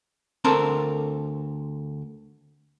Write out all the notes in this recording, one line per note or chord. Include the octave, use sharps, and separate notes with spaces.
D2 C4 A4 A#4